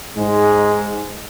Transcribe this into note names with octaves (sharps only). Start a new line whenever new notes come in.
G#2 G#3